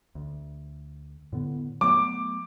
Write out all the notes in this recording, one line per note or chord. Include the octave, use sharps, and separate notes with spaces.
D2
A2 D3 B3
F#3 A3 B3 D6